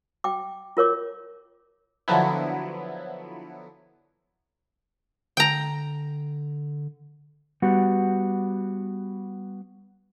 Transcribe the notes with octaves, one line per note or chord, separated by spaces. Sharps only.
G5 D6
F4 A#4 C#5 D6
D3 F3 F#3 B3 E4
D3 G5 A#5
G3 B3 F#4